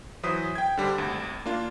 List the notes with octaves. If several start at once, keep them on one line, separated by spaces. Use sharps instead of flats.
E3 F#3 C5 D#6 B6
G5 G#6
D3 G3 G4 C5
G#1 D2
A#3 D4 F4